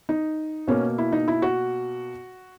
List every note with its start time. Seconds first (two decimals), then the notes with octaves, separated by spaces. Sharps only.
0.09 D#4
0.67 B2 A#3 C#4
0.98 E4
1.12 D#4
1.28 E4
1.42 F#4